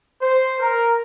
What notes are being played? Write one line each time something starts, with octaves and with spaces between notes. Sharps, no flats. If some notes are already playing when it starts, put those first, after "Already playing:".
C5
A#4